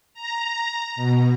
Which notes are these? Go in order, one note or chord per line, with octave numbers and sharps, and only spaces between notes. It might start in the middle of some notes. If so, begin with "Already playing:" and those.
A#5
B2